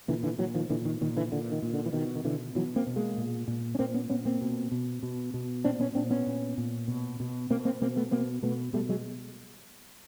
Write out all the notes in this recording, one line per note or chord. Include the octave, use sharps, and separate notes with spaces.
A#2 D3 E3
D3 E3
A#2 E3 F#3
D#3 F3
A#2 D3 E3
D#3
A#2 D#3
D3 E3
A#2 D3
D#3
A#2
D3
E3
B2 D#3
D#3
B2 D3 E3
B2 E3 F#3
A#3 C4
B2
G#3 A#3
A#2
A#2
C#4
A#2 A#3 C4
B3 C#4
A#2 B3 C#4
A#3 C4
B2
B2
B2
B2
A#2 C4 D4
B3 C#4
A#2 C4 D4
B3 C#4
A#2
A#2
B2
B2
B2 A#3 C4
A#3 C4
B2 A#3 C4
A3 B3
B2 A#3 C4
B2 A3 B3
B2 G3 A3
F#3 G#3